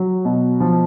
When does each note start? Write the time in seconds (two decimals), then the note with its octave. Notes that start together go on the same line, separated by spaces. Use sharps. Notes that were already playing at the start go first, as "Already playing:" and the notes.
Already playing: F#3
0.25 B2
0.60 F3